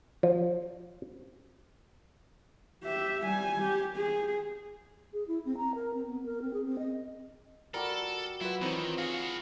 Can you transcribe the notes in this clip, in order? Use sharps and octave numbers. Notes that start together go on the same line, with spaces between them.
F3
G4 E5
G3 G#5
G4
G#4
G#4
E4
C4
A#5
A#4
C4
B3
A#4
C4
G#4
C4
D#5
G3 F#4 G4 A4 A#4
F#3 E4 F4 B4 F#5
D#3 E3 C4 D#4 B4 C#5 D#5
F#4 G#4 F5